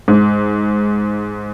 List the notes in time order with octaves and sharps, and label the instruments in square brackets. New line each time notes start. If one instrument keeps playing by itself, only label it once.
[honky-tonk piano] G#2